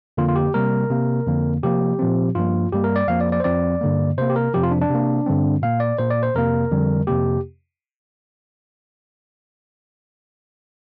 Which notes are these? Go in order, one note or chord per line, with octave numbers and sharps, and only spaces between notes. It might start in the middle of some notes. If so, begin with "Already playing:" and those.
F2 D3 A#3 F4
F4
G4
C3 G3 A#3 A#4
C3 A#3
F2 D3 A#3
C3 F3 A#3 G4
A#2 F3 C4
G2 F3 A#3 F4
G2 G3 A#3 G4
A#4
D5
F2 F3 A#3 F5
D5
D5
C5
F2 F3 C4 D5
G2 D3 A#3
C3 A#3 C5
G4
A#4
F2 C3 F3 G4
F4
D4
D4
C3
A#3
G2 D3 G3 C4
A#2 A#3 F5
D5
A#2 A#3 C5
D5
C5
F2 C3 A#3 A#4
F2 D3 G3
F2 C3 A#3 G4